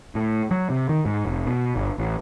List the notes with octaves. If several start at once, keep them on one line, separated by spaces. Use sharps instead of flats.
A2
F#3
C3
D#3
G#2
F1
B2
G1
A1